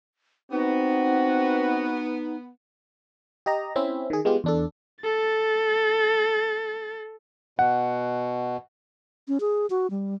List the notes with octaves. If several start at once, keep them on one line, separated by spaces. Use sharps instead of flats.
B3 C4 D#4 F#4
G4 D#5 A#5
C4 C#4 E4 E5
D#3 G#4
G#3 B3 F4 G4
E2 D4 A4
A4 A6
B2 F#5
C#4
G#4
F#4
G3